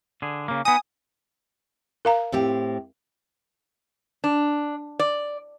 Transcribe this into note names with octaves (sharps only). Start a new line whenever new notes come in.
D3 G#4
C#3 A#3
B3 D#4 G#5 D#6
A#4 F5 A#5
A2 C4 G4
D4
D5